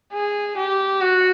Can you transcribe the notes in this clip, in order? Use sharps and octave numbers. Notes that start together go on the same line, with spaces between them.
G#4
G4
F#4